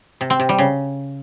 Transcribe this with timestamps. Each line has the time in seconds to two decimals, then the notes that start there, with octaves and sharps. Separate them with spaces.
0.21 C3
0.30 C4
0.40 C3
0.49 G3
0.58 C#3